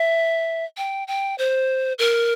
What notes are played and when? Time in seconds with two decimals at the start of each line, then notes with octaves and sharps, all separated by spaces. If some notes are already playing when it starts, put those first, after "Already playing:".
Already playing: E5
0.77 G5
1.08 G5
1.38 C5
1.99 A#4